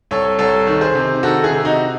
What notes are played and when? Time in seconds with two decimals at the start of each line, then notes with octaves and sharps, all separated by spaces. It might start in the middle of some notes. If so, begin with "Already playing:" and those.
0.11 C2 A4 C#5
0.39 C2 A4 C#5
0.67 D#3
0.81 G#4 C5
0.95 C3
1.23 D#3 F#4 A4
1.44 E4 G#4
1.51 C3
1.65 D#4 F#4